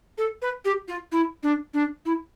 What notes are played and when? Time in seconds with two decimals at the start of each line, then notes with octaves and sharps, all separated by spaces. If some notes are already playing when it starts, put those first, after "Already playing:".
0.18 A4
0.42 B4
0.65 G4
0.88 F4
1.12 E4
1.43 D4
1.73 D4
2.05 E4